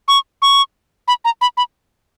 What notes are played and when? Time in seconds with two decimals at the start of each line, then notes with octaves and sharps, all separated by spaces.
0.08 C#6
0.42 C#6
1.08 B5
1.25 A#5
1.41 B5
1.57 B5